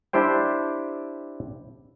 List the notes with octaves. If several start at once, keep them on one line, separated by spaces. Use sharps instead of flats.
D4 E4 G4 C5 G5